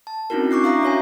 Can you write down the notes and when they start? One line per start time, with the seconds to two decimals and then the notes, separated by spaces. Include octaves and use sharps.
0.07 A5
0.30 C4 C#4 D#4 E4 F#4 A#4
0.51 D4 C#6 D6 F#6 C7
0.64 E5 F5 A#5 D6 D#6 A#6
0.83 C#4 F#4 C#5 E5 G#5